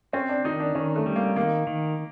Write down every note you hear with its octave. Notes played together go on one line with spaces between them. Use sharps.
C4 C#4
D4
D#3 D#4
D4
D#3 C#4
A3
G3
A#3
D#3 A#3
D#3